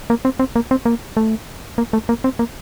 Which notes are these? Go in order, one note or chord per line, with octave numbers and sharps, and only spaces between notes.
A#3
C4
C4
A#3
C4
A#3
A3
A#3
A3
A#3
C4
A#3